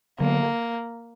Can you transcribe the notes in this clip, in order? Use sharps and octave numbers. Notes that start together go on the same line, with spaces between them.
D3 F#3 A#3 B3